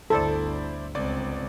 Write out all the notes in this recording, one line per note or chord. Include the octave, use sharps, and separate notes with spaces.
G1 D2 E4 A4 C5 D5
G1 C#2 C4 D5 D6